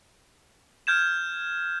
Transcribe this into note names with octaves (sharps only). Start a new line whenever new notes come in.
F6 G6 G#6 E7